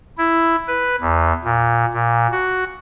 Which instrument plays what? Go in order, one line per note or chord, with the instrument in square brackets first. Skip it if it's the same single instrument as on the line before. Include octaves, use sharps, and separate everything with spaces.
[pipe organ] E4
B4
E2
A#2
A#2
F#4